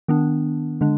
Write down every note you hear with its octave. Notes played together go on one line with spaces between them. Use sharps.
D#3 B3 D4
D3 G#3 D4